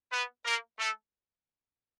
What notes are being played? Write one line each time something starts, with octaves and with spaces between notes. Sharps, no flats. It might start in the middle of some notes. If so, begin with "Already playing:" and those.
B3 B4
A#3 A#4
A3 A4